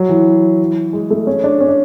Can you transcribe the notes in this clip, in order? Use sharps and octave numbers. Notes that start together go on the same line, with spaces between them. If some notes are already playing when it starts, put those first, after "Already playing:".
Already playing: F#3
E3
G#3
A3
C#4
D4
C#4
D4